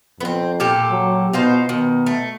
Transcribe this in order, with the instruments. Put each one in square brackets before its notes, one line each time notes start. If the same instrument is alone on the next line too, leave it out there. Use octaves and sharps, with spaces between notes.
[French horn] F2 [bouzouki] B3 C4
[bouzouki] A#2 G4 A4
[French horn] F#3
[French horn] B2 [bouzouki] D#4 F4 C5
[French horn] B2 [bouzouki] D#3
[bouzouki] A3